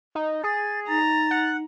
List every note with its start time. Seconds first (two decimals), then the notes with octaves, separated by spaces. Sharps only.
0.15 D#4
0.44 G#4 A6
0.88 D#4 A#5 A6
1.31 F#5